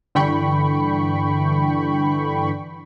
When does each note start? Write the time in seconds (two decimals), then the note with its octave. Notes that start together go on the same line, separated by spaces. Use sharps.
0.15 G2 D3 E3 G5 B5 C#6